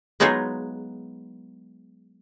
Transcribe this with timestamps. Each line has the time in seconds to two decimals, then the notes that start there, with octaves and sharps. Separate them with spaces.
0.20 F#3 G#3 B3 D#4 F4 G#4